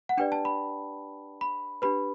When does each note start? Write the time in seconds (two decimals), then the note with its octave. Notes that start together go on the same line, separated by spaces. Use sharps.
0.09 F#5
0.17 D4 G4 B4 D5 G5
0.32 A5
0.45 B5
1.41 B5
1.82 D4 G4 B4 B5